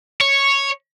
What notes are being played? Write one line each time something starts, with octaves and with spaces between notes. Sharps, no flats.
C#5